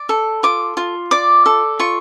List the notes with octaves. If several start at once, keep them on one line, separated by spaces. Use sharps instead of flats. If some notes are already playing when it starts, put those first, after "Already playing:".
Already playing: D5
A4
F4 D6
F4
D5 D6
A4
F4 C#6